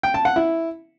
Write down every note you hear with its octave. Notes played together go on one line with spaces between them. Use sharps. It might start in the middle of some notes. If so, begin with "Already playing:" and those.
G5
A5
F#5
E4